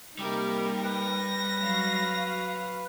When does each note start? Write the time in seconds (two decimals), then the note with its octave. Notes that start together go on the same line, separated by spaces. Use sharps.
0.19 C3 G3 A#3 D#4 G4 A#4
0.84 B4 A#6
1.59 F#3 F#4 F5